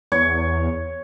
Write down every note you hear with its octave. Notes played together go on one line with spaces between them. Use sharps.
E2 C#5